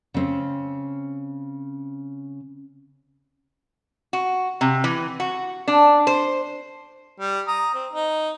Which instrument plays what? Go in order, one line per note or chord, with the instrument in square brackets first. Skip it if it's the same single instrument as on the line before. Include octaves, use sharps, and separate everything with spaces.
[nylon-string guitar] C#3 C4
[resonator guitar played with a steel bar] F#4
C3
E3
F#4
D4
C5
[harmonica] G3
A#5 D#6
C4
D#4